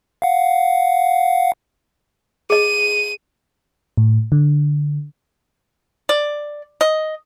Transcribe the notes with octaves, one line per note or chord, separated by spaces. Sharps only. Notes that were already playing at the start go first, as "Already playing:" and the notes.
F5 F#5
G#4 D#5 D#7
A2
D3
D5
D#5